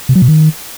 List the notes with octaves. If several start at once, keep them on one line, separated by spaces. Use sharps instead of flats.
C3
F#3
B2
D#3